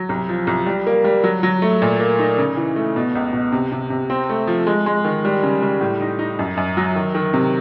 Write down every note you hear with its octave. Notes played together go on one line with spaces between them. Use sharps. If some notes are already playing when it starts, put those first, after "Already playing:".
Already playing: F#3
C2
F3
C2
G3
A#3
G3
F#3
F#3
A3
A#2
A#3
D#4
C#3
E3
A3
B2
C#2
B2
C3
C3
C3
C4
A3
F3
G#3
G#3
D#3
G3
C#3
G3
A2
D#4
D#4
F#2
F#2
F#3
D#3
D#3
C3